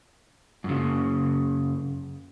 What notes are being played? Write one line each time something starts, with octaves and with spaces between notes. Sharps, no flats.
F#2 C#3